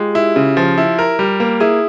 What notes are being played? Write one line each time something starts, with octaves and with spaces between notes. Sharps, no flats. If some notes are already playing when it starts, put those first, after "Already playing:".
Already playing: G#3 F4 G4
E4
C#3
F3
E4
A#4
G3
A#3
E4 G#4